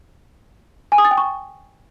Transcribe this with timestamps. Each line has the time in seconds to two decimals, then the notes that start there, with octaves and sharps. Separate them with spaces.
0.92 G#5
0.98 D#6
1.05 A6
1.11 G5
1.17 C#6